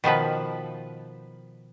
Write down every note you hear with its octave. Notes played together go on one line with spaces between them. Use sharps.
B2 D#3 F3 B4